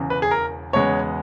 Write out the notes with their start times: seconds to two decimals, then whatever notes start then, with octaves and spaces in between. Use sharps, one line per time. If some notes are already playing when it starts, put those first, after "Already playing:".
Already playing: E1 E2 C#3 E3
0.10 B4
0.22 G#4
0.31 A#4
0.73 E1 E2 C#3 G#3 B3 C#5